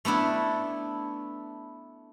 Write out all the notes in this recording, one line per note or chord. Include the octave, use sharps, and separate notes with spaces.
A3 B3 D4 E4